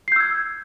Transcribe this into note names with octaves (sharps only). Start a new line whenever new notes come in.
E6 G6 G#6 C7